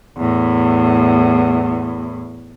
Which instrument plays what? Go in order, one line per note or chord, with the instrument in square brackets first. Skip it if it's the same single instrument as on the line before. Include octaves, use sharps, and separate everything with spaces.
[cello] E2 A2